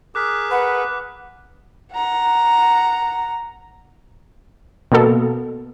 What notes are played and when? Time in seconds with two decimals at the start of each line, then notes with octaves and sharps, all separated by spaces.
0.15 G#4 A#4 D6 F#6 B6
0.51 B4 F#5
1.94 F#5 A#5
4.92 B2 A#3 B3 A4